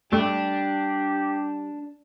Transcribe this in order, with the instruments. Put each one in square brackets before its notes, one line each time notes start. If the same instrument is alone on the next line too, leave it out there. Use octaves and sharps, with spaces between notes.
[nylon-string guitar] G3 [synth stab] A3 [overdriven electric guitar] D4 [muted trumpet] G4